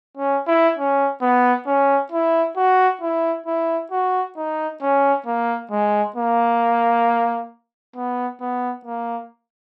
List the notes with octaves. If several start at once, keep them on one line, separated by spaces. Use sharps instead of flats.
C#4
E4
C#4
B3
C#4
E4
F#4
E4
E4
F#4
D#4
C#4
A#3
G#3
A#3
B3
B3
A#3